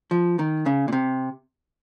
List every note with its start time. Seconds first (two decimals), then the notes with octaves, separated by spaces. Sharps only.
0.11 F3
0.39 D#3
0.66 C#3
0.88 A#2
0.93 C3